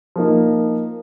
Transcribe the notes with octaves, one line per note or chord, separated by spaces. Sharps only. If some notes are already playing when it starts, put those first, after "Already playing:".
F3 A#3 D#4